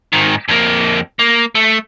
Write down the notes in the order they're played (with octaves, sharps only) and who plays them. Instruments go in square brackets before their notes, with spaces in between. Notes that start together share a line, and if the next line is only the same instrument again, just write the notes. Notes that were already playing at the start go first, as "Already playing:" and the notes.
[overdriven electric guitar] G#2 D#3
F2 A#3
A#3
A3